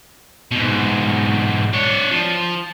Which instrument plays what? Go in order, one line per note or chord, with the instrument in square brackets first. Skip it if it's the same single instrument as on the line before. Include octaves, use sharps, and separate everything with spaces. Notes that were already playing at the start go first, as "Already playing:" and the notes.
[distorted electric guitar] G#2 B2
D4 C#5
F3